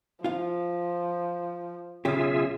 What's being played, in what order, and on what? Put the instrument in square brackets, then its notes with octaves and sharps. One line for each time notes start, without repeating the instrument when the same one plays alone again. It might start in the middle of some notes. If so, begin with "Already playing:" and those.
[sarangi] F3 [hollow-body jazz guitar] F4 F5
[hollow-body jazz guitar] B1 C#3 G4 [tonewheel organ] F4 G#4 E5